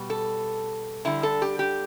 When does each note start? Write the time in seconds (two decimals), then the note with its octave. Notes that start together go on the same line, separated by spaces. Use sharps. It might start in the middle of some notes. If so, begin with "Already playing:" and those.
Already playing: B2 G3
0.10 A4
1.05 D3 G3 E4
1.23 A4
1.42 G4
1.59 G4